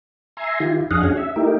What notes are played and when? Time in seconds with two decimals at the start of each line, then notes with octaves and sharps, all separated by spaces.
0.37 E5 G#5 A#5 C6
0.60 D#3 E4 F4 G4
0.91 F2 D4 G#4 D#5 F5 F#5
1.04 C#4 D4 F#4 G#4 C#5
1.17 E5
1.36 A3 D#4 E4 G4 A#4